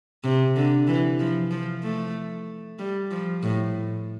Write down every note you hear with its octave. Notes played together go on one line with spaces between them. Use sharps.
C3
D3
E3
F3
F3
A3
G3
F3
A2